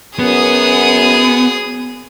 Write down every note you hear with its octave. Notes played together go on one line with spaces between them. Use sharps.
F#2 B3 G#4 D#6